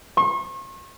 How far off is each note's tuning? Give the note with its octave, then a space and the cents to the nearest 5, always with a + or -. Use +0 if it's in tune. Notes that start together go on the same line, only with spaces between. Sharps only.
C#6 -40